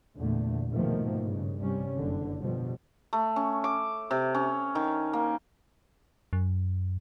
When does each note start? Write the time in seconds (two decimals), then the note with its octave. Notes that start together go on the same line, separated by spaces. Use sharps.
0.16 E2 A#2 D3 A3
0.71 G#2 B2 D#3 F3 A3 A#3
1.23 G2 C#3
1.60 C3 G3 C#4
1.96 F#1 D3
2.41 B2 F3 G3
3.13 A3
3.36 C#4
3.64 D6
4.11 C3
4.34 C#4
4.75 D#3
5.13 A#3
6.33 F#2